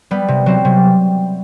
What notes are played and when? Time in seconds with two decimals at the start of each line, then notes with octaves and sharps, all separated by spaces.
0.11 G3 B3
0.28 C3
0.46 F#3 C4
0.65 C3